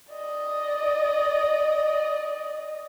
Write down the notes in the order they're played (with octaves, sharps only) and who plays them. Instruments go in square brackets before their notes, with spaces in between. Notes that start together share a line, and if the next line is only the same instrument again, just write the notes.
[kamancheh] D5 D#5